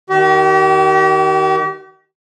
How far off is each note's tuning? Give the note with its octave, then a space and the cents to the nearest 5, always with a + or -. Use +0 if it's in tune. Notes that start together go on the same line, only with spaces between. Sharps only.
D#3 +0 G4 -40